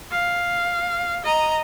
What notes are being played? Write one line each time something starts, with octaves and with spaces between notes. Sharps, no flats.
F5
D#5 A#5